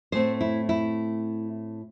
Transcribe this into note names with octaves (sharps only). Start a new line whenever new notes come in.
A2 A3 C4 C5
E4
E4